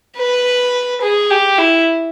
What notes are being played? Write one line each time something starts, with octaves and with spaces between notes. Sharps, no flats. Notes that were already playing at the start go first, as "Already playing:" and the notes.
B4
G#4
G4
E4